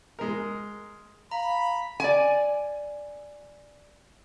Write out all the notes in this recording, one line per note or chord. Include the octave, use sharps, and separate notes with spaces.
G#3 A#4
F5 A#5 B5
D5 G#5